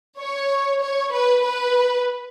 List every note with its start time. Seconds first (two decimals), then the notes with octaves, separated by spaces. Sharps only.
0.19 C#5
0.81 C#5
1.12 B4
1.43 B4